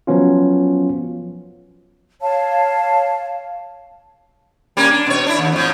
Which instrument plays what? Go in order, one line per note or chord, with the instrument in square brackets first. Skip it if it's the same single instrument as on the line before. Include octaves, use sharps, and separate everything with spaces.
[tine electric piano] F3 F#3 B3 C#4 F4
[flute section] C#5 F5 A5
[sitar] G3 A#3 C#4
D4
B2 C#5
D4 E4
D#2
F2 A2